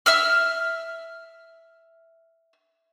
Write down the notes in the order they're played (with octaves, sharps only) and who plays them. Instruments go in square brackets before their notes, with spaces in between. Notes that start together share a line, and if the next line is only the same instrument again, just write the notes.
[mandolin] E5 E6 F6